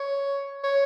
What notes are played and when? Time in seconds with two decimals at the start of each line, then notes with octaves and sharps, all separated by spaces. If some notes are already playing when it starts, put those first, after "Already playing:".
Already playing: C#5
0.63 C#5